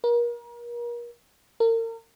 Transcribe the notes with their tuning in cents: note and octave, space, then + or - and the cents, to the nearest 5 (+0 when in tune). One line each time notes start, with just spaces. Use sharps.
A#4 +35
A#4 -35